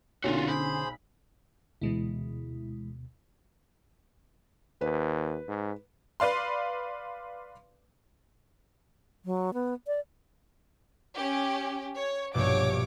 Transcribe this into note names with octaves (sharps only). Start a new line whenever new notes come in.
B1 A#2 D3 C#4 F4 F#4
G#4 C5 B5
D2 B2 E3 G#3 E4
D#2 B4
G#2
B4 D5 F5 C6
F#3
B3
D5
C#4 G4
C#5
A#1 G2 B2 C#5 D6